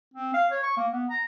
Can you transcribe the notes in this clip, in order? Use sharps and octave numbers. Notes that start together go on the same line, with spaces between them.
C4
F5
C#5
C#6
A#3
B3
A#5